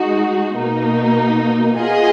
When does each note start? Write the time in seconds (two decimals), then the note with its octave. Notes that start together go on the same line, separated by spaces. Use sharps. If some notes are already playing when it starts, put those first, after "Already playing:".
Already playing: G#3 D#4 F#4
0.58 B2 A#3 D#4
1.79 B3 F4 G#4 D#5